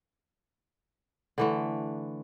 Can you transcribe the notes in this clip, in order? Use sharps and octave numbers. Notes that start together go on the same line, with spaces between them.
D3 E3 A3